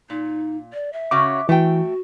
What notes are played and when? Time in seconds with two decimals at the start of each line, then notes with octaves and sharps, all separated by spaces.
0.10 A#2 D#4
0.73 D5
0.93 E5
1.11 C#3 C#4 F#4 D6
1.49 E3 A3 F#4 G5